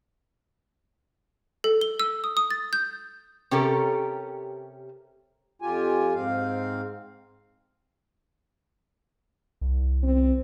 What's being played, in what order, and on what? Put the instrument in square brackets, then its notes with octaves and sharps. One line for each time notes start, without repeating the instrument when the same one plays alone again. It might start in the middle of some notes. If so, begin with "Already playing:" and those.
[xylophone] A4
G7
E6
D#6
D#6
A6
G6
[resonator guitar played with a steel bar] C3 C#4 G4 A4 A#4
[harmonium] F2 F4 G4 G#5
G#2 C4 F5
[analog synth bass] C2
[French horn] C4